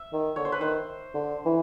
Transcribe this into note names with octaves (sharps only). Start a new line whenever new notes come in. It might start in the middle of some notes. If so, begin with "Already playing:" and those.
Already playing: E5
D#3
D3 C#5
C5
B4
D#3 C5
D3
E3